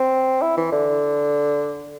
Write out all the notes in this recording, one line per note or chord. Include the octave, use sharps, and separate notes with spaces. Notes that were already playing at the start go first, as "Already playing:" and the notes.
Already playing: C4
E4
E3
D3